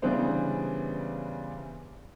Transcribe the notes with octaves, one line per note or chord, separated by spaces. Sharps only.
C#3 E3 G3 B3 D4 C5